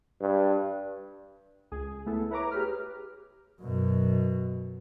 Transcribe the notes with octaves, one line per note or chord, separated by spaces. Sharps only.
G2
C#2 G#4
A3 B3 E4 A4
E4 B4 C#5 A#5 D6
G4 G#4 B4 F6
F#2 B2